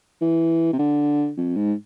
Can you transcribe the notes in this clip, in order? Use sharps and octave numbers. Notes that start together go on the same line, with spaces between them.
E3
C3
D3
F2
G#2